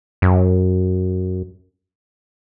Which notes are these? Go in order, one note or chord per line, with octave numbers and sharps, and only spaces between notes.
F#2